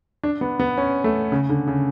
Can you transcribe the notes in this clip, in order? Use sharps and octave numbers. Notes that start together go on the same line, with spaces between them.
D4
B3
B3
C#4
A3
C#3
D3
C#3